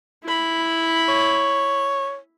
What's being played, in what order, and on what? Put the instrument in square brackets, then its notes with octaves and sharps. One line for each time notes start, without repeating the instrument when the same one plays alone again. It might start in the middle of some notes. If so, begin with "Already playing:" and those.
[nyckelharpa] E4 B5
[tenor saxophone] C#5